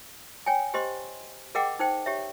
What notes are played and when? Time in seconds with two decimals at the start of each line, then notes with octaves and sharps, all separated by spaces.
0.46 C#5 G5 G#5
0.74 G4 C5 D#5 C6
1.55 G#4 A#4 D#5 F#5 G5 D6
1.79 D#4 C5 G5
2.06 G4 C#5 E5